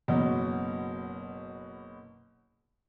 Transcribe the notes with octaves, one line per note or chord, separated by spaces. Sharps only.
F#1 B2 F#3